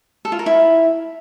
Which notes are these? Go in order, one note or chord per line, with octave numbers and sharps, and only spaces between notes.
A4
F4
A#4
E4